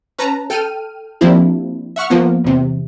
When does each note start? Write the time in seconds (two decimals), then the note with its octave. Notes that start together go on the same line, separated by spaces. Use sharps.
0.18 C#4 B4 A5 A#5
0.50 A4 G5 F6 D#7
1.21 F3 A#3 C4 D4 E4 G4
1.96 E5 F#5 C#6 F6
2.10 F3 A#3 B3
2.44 E2 C3